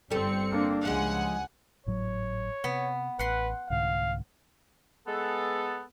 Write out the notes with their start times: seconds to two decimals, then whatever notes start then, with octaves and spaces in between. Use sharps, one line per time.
0.10 G1 G3 C4 A4 C#7
0.51 A#3 D4
0.85 C#2 F3 G#3 F#5 G#5
1.86 G#1 A2 F#3 C#5
2.64 C3 B3
3.19 A1 B4 F#5 C6
3.70 C2 G#2 D3 F5
5.07 G#3 B3 A4